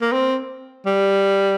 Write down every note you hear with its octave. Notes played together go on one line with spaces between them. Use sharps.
A#3
C4
G3